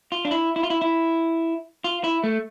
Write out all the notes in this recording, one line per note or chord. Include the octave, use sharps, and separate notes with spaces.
F4
D4
E4
E4
F4
E4
E4
F4
E4
A3